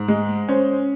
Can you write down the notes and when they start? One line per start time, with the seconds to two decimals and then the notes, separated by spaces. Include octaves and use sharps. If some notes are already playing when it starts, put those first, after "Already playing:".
Already playing: G#2
0.08 G#3
0.49 C#4 C5